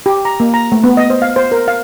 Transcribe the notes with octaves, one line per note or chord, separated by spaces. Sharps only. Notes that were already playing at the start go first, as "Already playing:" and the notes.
G4
A#5
A#3
A#5
A3
B3
D#5
C5
F5
C5
A#4
F5